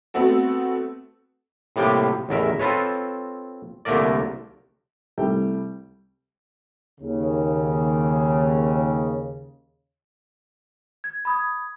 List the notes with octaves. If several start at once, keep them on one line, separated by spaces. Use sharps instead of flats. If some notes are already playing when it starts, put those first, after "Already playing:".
A3 B3 C4 F#4 A4
A2 C3 G3 A#3 G4
A1 E2 A#4 E5
C4 F4 A4 B4 C#5
C2 D3 A3 A#3 A#4 D5
C2 G3 A3 E4 G5
D#2 C#3
G#6
B5 D#6 G#6